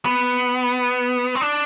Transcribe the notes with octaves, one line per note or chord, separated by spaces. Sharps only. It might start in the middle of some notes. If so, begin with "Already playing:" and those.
B3
C4
D4